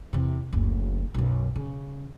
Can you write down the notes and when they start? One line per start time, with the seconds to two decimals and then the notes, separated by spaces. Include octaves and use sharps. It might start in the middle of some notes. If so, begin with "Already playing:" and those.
0.13 E2 C3
0.53 F#1 D2
1.14 B1 F#2
1.56 C#3